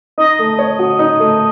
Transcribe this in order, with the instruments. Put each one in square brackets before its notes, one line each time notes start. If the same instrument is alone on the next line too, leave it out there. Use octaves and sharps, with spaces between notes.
[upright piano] D#4 [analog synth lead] D#5
[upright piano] A3
C#5
F#4
D#4
A3